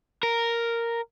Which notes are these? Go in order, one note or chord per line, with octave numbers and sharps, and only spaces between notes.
A#4